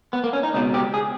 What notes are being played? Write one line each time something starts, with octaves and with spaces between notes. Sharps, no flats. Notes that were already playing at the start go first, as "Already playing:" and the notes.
B3
A#3
C#4
D#4
C#2 B2 D#4
G4
G#4